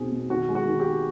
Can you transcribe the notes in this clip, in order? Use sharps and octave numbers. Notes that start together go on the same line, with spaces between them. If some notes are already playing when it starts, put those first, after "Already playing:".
Already playing: B2 C4 D#4 G#4
B2
D#3 F#4
G#3
F#4
D#3
G4